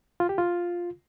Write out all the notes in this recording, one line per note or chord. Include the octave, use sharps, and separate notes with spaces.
F4
G4
F4